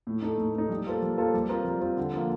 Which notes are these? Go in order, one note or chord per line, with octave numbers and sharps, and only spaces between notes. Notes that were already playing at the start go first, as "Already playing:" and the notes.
A2
A3 D#4
A2
A3 D#4
G3
A#3 F4 A4 C5
G3
A#3 F4 A4 C5
G3
C4 F4 A#4
G3
C4 F4 A#4
D3
F3 A#3 F4